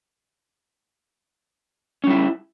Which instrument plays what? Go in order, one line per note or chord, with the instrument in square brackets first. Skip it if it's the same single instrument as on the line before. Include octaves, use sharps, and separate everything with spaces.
[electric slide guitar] C#4
G3
E4